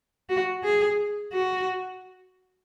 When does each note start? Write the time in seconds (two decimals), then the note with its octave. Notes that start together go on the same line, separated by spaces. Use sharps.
0.29 F#4
0.63 G#4
1.33 F#4